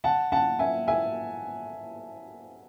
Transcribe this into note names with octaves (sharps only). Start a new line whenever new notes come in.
F#5 A5
F#5 A5
E5 G#5
E5 G#5